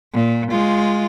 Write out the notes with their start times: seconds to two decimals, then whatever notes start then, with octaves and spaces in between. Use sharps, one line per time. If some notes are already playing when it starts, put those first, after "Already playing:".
0.14 A#2
0.51 G#3 F4